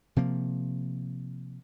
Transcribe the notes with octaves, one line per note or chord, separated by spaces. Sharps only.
C3 F3 A#3